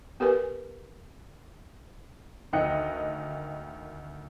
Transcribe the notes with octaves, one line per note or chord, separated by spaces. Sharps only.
B3 G4 A#4 B4 G#5
D2 D#3 D#5 G5 F#6 C#7